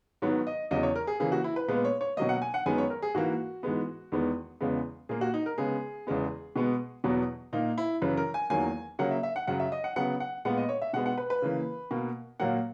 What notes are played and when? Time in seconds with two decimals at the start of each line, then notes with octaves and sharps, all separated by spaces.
0.22 G#2 D#3 F#3 B3 C#5
0.47 D#5
0.71 E2 C#3 F#3 D#5
0.83 C#5
0.95 A#4
1.07 G#4
1.20 C#3 E3 A#3 G#4
1.32 F#4
1.44 E4
1.56 B4
1.68 A#2 G#3 B3 B4
1.85 C#5
2.01 C#5
2.17 B2 F#3 A#3 D#5
2.29 F#5
2.42 G#5
2.54 F#5
2.66 F#2 D#3 G#3 B3 G#5
2.78 C#5
2.90 A#4
3.02 G#4
3.15 G#2 E3 A#3 F#4
3.63 G#2 E3 G#3 B3
4.12 E2 D#3 G#3 B3
4.61 E2 C#3 G#3 B3
5.09 A#2 A#3 G#4
5.21 F#4
5.34 D#4
5.46 A#4
5.58 C#3 G#3 B3 G#4
6.07 E2 C#3 G#3 B3
6.56 B2 G#3 B3
7.04 E2 B2 F#3 B3
7.53 A#2 A#3 D#4
7.78 E4
8.01 F#2 C#3 E3 B4
8.17 A#4
8.34 G#5
8.50 E2 D#3 F#3 A#3 G#5
8.99 C#3 F#3 A#3 F#5
9.11 E5
9.23 E5
9.36 F#5
9.47 F#2 C#3 F#3 F#5
9.60 E5
9.72 D#5
9.84 F#5
9.96 C#3 F#3 B3 F#5
10.20 F#5
10.45 A#2 G#3 B3 F#5
10.58 D#5
10.69 C#5
10.82 E5
10.93 B2 G#3 B3 F#5
11.06 F#5
11.18 B4
11.30 B4
11.42 C#3 E3 A#3
11.91 B2 A#3
12.40 A#2 F#3 A#3 F#5